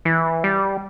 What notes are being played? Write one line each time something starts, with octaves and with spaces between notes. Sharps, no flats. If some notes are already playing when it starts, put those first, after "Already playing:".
E3
G3